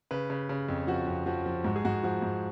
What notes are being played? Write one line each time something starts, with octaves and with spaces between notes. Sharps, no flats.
C#3 B4
C#3
C#3
F2
F3 F#4
F2
F3 F#4
F3
G#2 F#4
G#4
G#2 F#4
F3 F#4
G#2